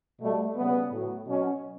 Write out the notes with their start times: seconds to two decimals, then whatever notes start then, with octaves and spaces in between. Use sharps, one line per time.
0.20 B2 G3 A3
0.56 C#3 G3 B3
0.91 A2 F#3
1.26 B2 F#3 C#4